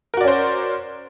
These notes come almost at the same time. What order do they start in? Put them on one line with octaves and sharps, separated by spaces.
A#4 F#4 D5 C#4 C5